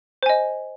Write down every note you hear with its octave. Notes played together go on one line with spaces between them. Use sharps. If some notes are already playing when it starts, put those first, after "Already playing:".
C5 D#5 G#5